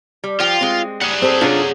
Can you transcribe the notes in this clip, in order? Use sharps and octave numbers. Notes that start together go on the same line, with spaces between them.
G3
F3 F4 G5
G#3 C4
G3 G#4 F#5
C4 G4 A4
C3 F#3 C#4 D4 F4 A4